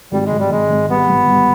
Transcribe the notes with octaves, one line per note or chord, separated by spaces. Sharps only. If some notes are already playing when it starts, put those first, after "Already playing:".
G#1 G3
G#3
G#1
G3
G#1 G#3
G#1
G3 B3
G1
G3